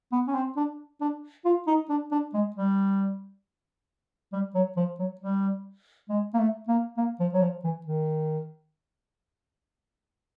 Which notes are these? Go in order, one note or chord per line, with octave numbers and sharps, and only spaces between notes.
B3
C#4
C4
D4
D4
F4
D#4
D4
D4
G#3
G3
G3
F#3
F3
F#3
G3
G#3
A#3
A3
A#3
A#3
F3
F#3
F3
E3
D#3